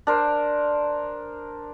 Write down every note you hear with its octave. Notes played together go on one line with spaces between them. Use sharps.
D4 A#4 C5